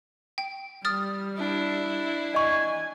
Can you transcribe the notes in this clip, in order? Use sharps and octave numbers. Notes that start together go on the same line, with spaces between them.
G5
G3 D#6 F6 A6
D4 E4
D#5 G#5 C#6